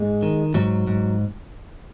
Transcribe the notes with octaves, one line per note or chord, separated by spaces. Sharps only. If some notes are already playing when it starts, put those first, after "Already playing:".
Already playing: G#2 G#3
D#3
G#2 F#3
G#2